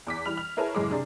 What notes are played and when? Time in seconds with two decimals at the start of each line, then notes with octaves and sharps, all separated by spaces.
0.07 E2 D6 B6
0.25 E3 G3 B5 F6 F7
0.37 F6
0.57 E4 G#4 A#4 B4 C#5 A5
0.75 F#1 F#2 A2 G#3 G#4 D6
0.90 C3 D4 G#4